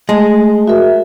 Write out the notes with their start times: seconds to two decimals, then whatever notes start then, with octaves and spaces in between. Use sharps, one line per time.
0.09 G#3 A3
0.67 F#4 A#4 E5